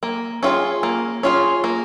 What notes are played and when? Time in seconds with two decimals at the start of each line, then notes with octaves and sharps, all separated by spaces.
0.03 A#3
0.43 C#4 F4 G#4
0.83 A#3
1.23 C#4 F4 G#4
1.64 A#3